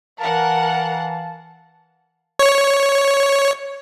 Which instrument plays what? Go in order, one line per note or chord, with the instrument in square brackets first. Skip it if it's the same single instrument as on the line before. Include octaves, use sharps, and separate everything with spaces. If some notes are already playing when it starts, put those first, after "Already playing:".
[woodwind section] E3 F5 A5 [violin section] A#4 F#5
[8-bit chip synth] C#5